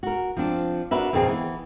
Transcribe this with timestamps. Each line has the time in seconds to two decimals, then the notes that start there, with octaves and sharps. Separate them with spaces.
0.03 F#4 A#4
0.37 F3 C4 D4
0.91 D4 F#4 A#4 B4 E5
1.13 F2 A#2 D#3 C4 G#4
1.28 E3 B3